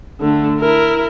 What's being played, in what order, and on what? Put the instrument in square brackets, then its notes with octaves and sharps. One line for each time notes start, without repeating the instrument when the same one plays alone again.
[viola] D3 A3
E4 A#4